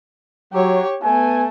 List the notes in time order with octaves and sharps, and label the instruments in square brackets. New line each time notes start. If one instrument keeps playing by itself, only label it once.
[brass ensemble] F#3 [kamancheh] G4 C#5
[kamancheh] A3 [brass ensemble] B3 G#5